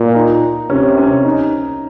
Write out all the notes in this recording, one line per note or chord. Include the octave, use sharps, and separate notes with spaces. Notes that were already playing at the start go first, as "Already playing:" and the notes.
Already playing: A#2
D#4
C3 C#4
C#4
D#4